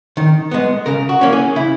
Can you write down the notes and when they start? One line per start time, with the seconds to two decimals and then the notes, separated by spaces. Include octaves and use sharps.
0.17 D#3
0.51 G#3 B3
0.86 C#3 A#4
1.09 F#4
1.21 E3 A#3 C#4
1.33 G#4
1.56 C#3 E4